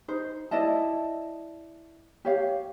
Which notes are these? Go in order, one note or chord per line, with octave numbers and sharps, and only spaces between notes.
D#4 C5
E4 D5 D#5 A5
G4 C#5 F5